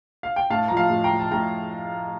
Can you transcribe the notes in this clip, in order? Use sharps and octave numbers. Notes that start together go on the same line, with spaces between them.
F5
G5
A2 F5 A5
F3 A#5
F5 A5
A2
G5 A#5
F3
A5
A2 G5 A#5